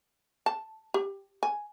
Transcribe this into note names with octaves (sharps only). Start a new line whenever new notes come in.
A5
G4
G#5